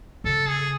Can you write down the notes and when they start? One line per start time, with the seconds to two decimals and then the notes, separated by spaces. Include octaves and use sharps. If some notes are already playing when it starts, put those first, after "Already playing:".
0.24 C#3 A4
0.49 G#4